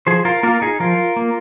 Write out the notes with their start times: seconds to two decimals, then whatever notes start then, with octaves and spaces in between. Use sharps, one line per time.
0.07 F3 G#4 C5
0.25 F4 A#4
0.43 A#3 F4 A#4
0.62 D#4 G#4
0.80 F3 F4 A#4
1.16 A#3